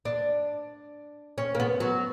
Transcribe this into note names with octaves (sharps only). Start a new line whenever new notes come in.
D4
C#4
A#3
B3
F#3